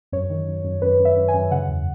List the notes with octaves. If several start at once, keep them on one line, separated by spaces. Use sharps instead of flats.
F#2 C#5
D#3
F#2
F#2
F#2 B4
F#2
E5
F#2
G#5
F#2
C#3 F#5
E2